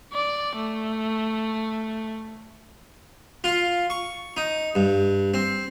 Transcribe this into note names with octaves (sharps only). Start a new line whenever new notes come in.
D5
A3
F4
C#6
D#4
G2
C4